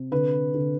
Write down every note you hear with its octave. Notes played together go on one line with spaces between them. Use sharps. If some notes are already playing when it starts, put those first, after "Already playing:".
Already playing: C3
D3 B4
D3